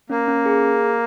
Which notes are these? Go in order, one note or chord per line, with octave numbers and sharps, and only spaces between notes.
A#3 C#4
C#4
G#4